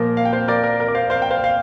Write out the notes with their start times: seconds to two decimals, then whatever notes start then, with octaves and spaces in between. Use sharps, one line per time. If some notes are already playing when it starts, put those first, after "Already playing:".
Already playing: A#2 F3 A#3 A#4
0.17 F5
0.25 G5
0.33 C5 F5
0.48 A#4 D5
0.64 A#4
0.80 A#4
0.88 D5
0.95 C5 F5
1.10 C5 F5
1.22 G5
1.31 C5 F5
1.44 F5